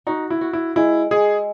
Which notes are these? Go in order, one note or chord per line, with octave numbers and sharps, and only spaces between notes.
D#4 F#4
E4
F#4
E4
G#3 E4
G#3 G#4